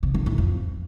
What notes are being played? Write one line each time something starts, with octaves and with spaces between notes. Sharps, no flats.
C3
D3
A2
F2